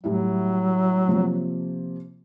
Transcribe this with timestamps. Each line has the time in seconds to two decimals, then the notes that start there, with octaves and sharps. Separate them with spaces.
0.04 A2 F#3 G3 E4
1.08 C3 F3 A#3